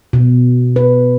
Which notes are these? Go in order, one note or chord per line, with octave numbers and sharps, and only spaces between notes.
B2
B4